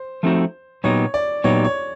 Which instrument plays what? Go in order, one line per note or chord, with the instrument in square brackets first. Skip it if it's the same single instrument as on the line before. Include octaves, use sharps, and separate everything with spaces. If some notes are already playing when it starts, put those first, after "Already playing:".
Already playing: [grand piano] C5
[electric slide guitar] F3 A3 C4 D#4 F#4
[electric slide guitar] A#2 F#3 B3 D#4 G4 [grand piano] C#5
[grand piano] D5
[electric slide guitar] A#2 F#3 B3 D#4 G4 [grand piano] C#5
[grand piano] C#5